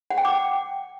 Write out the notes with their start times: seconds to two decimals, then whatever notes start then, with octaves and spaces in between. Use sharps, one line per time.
0.10 F#5
0.18 G5
0.25 D6